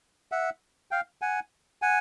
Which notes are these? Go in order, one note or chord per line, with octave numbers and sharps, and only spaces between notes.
E5 F#5
F5 G5
F#5 G#5
F#5 G#5